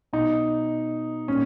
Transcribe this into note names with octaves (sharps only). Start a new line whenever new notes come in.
B2 D#4
A#2 C#4